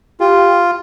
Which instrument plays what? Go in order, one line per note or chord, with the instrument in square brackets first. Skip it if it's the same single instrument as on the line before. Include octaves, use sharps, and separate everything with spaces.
[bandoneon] F4 [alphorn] G4